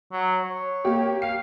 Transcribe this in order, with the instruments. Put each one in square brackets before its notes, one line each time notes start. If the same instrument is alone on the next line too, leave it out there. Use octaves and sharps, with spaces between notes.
[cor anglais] F#3
C#5
[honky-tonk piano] A#3 G4
[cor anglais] F5 [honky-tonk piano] C7